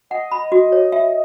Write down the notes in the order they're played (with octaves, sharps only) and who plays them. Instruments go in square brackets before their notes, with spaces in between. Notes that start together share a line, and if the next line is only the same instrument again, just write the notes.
[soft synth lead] D#5 [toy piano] F#5
[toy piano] B5
F#4
C#5
E5